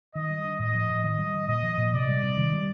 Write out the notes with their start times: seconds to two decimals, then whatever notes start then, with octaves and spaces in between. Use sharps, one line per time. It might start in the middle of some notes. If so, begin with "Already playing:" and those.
0.14 D#3 D#5
0.30 G3
0.45 D4
0.59 A2 D#5
0.75 F3
0.90 A2
1.04 D#3 D#5
1.18 G3
1.34 D#3
1.48 A#2 D#5
1.64 F3
1.78 A#2
1.93 C3 D5
2.08 G3
2.23 C3
2.37 D#3
2.53 G3